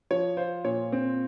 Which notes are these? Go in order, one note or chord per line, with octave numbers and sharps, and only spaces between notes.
F3 C#5
F4 C5
A#2 C#5
C4